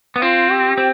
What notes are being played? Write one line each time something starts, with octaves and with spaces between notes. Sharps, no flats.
B3
C4 F4
G4
C4